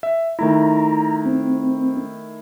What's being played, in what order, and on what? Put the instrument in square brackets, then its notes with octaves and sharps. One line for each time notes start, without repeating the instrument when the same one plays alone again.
[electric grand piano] E5
[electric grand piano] D#3 A3 E4 [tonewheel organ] A#5
[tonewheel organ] C4